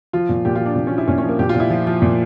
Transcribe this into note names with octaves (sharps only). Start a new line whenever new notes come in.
F3 F4
A#2
A#2 G4
F4
F3
D4
A#2
C#4
F3
E4
A#2 C#4
C#4
F3
A#3
A#2 G4
F4
A#2
E4
F3
F3
A#2